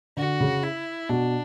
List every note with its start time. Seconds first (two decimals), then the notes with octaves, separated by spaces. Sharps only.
0.17 D3 F#4
0.40 C#3
0.63 E4
1.09 B2 D4